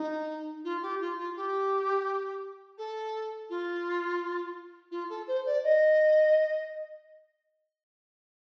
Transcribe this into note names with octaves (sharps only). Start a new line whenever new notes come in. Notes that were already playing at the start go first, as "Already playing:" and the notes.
Already playing: D#4
F4
G4
F4
F4
G4
A4
F4
F4
A4
C5
D5
D#5